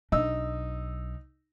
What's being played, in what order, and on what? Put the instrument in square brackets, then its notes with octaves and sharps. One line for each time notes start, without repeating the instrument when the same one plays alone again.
[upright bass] B1 D4 [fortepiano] D#4 E6